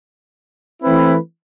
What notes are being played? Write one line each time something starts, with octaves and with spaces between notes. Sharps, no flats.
E3 A3 C4 E4 B4